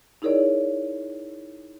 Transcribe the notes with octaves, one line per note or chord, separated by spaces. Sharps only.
D#4 E4 G#4 A#4 C#5 D5